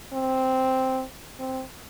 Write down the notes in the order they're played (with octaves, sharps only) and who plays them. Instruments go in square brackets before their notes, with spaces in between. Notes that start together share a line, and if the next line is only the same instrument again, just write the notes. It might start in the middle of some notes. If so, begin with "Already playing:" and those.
[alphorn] C4
C4